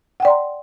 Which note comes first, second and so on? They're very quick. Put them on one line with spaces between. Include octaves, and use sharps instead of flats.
F#5 G5 D5 C6 A#5